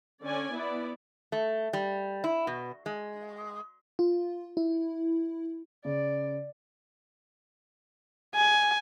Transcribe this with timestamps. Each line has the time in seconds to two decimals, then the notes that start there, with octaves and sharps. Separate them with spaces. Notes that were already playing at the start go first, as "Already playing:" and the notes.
0.22 D3 C#4 D5 G#5
0.55 B3 E4 D5
1.32 A3
1.73 G3
2.24 E4
2.47 B2
2.86 G#3
3.99 F4
4.57 E4
5.85 C#3 D5
8.35 G#5